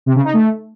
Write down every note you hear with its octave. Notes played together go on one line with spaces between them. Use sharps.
C3
C#3
D#4
A3